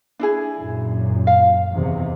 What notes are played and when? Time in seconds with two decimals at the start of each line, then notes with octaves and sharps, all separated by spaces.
0.19 D4 E4 G#4
0.58 F#2 A#2
1.27 F5
1.73 E2 C3 D#3